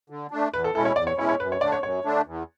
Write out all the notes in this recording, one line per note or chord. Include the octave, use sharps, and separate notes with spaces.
D3
A3 D4
E2 B4
A4
B2 G#3 C#4 E4 A4
C#5
E2 D5
C#5
B2 G#3 C#4 E4 C#5
C#5
F#2 B4
C#5
D3 A3 D4 D5
C#5
F#2 C#5
D3 A3 D4
E2